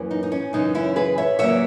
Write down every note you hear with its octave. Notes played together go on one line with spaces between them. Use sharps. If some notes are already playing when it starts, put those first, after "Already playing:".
Already playing: F#2 E3 A#3
D#4
D#4
C#4
F#2 C#3 E3 D#4
C#4 E4
G#4 B4
C#5 E5
E2 C#3 F#3 A#3 C#5 E5